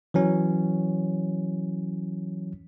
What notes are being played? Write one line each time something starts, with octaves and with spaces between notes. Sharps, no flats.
E3 F#3 C#4